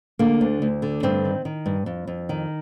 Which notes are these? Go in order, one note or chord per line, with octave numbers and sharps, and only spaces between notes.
D3 A#3
D2
D2
D3
G2 C4
D#3
D#3
G2
F2
F2
D#3